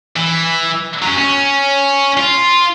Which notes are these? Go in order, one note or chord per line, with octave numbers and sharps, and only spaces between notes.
E3
F#3 C#4
C#4
F4